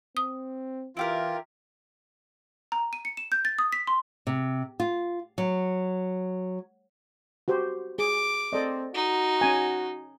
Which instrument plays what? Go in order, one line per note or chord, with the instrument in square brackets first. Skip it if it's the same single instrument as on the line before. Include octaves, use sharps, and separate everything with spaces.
[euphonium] C4 [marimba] D#6
[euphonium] E3 [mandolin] E4 G4 A#4 [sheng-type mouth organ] F4
[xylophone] A#5
D#7
C#7
E7
G6
A6
D#6
B6
C6
[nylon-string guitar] C3
F4
F#3
[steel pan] F#4 G4 C5
[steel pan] G#4 [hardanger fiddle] D6
[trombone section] C4 [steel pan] A4 D5 D#5
[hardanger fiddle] D#4 [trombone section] F#4
[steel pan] C#4 G#5